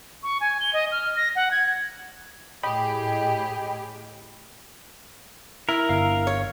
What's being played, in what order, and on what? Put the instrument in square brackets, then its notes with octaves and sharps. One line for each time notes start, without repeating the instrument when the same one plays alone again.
[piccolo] C#6
G#5
G7
D#5
F6
A#6
F#5
G#6
[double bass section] A2 [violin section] G4 G#4 [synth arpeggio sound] D#5 G5 B5
[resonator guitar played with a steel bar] E4 [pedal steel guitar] A#4
[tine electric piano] G1 F5
[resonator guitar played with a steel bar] C#5